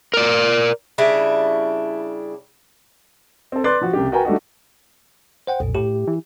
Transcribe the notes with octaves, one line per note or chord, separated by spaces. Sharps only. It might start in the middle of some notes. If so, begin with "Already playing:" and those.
A#4 D5
C#3 G3 D4 E4
C4 A4
B4 D5 C6 D6 F#6 A6
F3 F#4
C2 C#3 G4
F#4 A#4 B4 G5 G#5 A#5
G3 A3 D4 D#4 F#4
C5 F#5 G5
B1 F2 A#2
A2 G4
E3